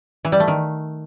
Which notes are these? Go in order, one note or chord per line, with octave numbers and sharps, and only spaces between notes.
E3
G3
A3
D#3